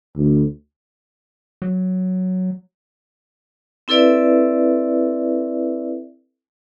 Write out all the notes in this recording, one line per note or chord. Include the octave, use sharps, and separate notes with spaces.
D2
F#3
C4 E4 A4 B4 D5 E5